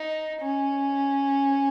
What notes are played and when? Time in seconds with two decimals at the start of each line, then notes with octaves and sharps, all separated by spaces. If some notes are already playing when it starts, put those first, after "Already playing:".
Already playing: D#4
0.42 C#4